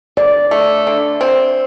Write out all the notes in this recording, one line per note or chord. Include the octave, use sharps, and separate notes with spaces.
D3 D5
A3
D3
C4